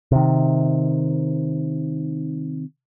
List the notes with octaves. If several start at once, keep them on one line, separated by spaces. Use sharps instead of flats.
C3 D#3